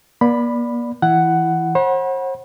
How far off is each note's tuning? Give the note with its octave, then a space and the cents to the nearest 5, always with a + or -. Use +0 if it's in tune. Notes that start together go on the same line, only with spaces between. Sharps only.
A#3 +45 D5 +0 B5 +0
E3 +0 E4 +10 F#5 +10
C5 +45 F#5 +0 B5 -35